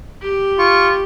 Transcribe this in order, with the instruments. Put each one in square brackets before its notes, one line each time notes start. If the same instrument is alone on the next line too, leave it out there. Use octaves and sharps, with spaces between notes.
[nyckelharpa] G4
[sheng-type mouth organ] F4 C#6